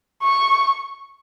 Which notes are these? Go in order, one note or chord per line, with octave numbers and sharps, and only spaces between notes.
C#6